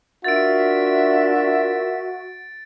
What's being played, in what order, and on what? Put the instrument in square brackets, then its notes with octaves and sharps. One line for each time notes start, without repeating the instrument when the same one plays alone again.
[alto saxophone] D4 [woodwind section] F4 A#4 E5 [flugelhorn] F#4 [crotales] A6 D7